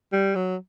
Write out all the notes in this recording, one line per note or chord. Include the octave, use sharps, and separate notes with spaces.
G3
F#3